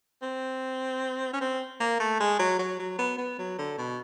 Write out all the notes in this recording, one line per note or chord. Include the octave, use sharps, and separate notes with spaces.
C4
C#4
C4
A#3
A3
G#3
F#3
F#3
F#3
B3
B3
F#3
D3
B2